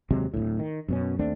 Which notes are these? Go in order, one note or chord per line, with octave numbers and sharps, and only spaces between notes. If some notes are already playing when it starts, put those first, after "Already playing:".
D#2 C3 F#3 G#3
D1 G#1 D2 A2
D#3
F#2 B2 C#4
D#2 A3 C4 D4